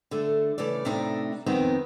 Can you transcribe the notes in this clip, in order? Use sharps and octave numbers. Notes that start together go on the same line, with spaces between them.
D3 A3
C#3 E3 A3 D5
A2 C3 A3 D4 D#4
F2 D#3 B3 C4 D#4